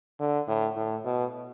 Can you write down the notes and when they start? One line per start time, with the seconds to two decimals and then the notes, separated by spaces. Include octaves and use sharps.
0.20 D3
0.48 A2
0.76 A2
1.05 B2